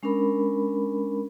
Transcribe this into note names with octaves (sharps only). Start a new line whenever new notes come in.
G#3 C#4 D4 A#4 B5